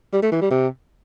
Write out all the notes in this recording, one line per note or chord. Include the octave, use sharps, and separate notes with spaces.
G3
A3
E3
G3
C3